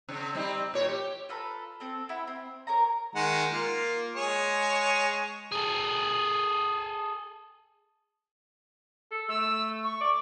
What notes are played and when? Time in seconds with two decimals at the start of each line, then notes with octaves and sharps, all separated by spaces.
0.09 C#3 C4
0.35 G3 C4 D#4
0.74 A#2 C#5
0.89 G4
1.29 F4 A4 B4 A#5
1.80 C4 A4
2.09 E4 F#5 B5
2.27 C4
2.67 A#4 C#5 A#5
3.15 D#3 G#3 F#5
3.52 A#3 F4
4.16 G#3 G#4 C#5
5.52 G#4 A4
9.12 A4
9.28 A3 E6
9.84 C#6
10.01 D5